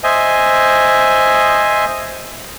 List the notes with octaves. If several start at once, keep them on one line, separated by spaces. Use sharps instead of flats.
C5 D#5 E5 G#5